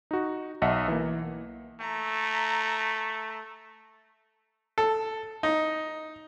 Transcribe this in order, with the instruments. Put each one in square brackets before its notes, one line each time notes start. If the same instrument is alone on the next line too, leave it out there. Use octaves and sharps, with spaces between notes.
[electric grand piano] D#4 F#4
B1 D#5 E5 F#5 A5 C#7
E3 A#3
[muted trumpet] A3 [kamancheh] A#5
[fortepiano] A4
D#4